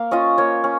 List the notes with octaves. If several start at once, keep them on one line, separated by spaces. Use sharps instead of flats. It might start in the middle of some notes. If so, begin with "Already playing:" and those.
Already playing: A#3 F5
C#4 F4 D#5
A#3 C#5
C#4